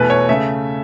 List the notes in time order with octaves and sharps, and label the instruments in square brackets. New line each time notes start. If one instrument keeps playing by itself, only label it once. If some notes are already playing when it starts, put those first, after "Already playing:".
Already playing: [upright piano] E2 B2 A3 B4
C#5
C#3 A3 E5